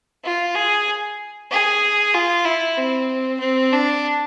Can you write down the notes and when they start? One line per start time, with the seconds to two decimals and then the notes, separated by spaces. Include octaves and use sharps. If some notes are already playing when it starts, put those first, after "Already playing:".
0.24 F4
0.55 G#4
1.51 G#4
2.14 F4
2.45 E4
2.77 C4
3.40 C4
3.72 D4